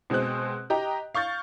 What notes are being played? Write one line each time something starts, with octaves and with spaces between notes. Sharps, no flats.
B2 G#3 C4 C5 F#6
G4 D#5 G5 A#5
F5 C#6 G6 A6